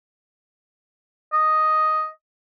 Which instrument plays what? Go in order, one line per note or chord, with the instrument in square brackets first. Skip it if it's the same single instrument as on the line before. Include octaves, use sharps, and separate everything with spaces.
[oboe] D#5